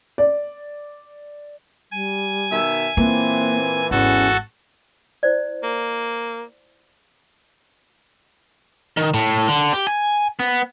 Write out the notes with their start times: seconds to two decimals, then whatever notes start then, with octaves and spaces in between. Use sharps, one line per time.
0.18 D5
1.92 G3 G#5
2.51 B2 D#3 E5
2.97 A#2 E3 A#3 C4
3.91 G#1 E2 C#4 F#4 A4
5.23 E4 C5 D5
5.63 A#3
8.97 D#3
9.14 A2
9.48 D3
9.73 G4
9.87 G#5
10.40 B3